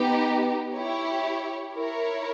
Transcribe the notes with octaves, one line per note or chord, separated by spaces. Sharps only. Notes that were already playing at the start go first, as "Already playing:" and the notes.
Already playing: B3 D#4 G4
E4 G4 C#5
E4 A#4 C#5